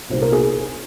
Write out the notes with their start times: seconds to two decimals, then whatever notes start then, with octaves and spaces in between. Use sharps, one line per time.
0.10 C2 A#2 A#3 D#4 C5
0.22 A#4
0.32 G#4